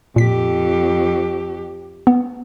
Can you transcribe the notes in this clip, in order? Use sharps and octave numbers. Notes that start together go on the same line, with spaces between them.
F2 A#2 G4 B6
B3